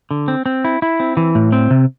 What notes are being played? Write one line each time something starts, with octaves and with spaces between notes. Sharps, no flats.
D3
C4
C4
E4
E4
C4
E3
A2
C4
C3